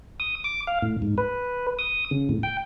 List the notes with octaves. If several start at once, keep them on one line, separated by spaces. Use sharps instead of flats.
D#6
D6
F5
A2
G#2
B4
D#6
C#3
A2
G5